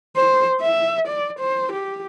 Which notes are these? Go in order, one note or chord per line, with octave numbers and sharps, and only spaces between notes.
C5
E5
D5
C5
G4